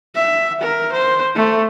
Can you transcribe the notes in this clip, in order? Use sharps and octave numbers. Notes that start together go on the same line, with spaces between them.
E5
A#4
C5
A3